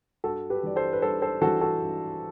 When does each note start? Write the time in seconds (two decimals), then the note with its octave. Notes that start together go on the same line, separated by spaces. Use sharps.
0.24 G2 F#4 A4
0.50 G4 B4
0.63 E3 G3 D5
0.76 A4 C5
0.93 B4
1.02 G2 A4 C5
1.22 A4 C5
1.42 E3 F#4 A4
1.45 G3
1.61 F#4 A4
1.81 G2